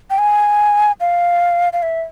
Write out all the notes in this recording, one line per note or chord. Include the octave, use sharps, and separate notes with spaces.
G5
G#5
F5
F5
E5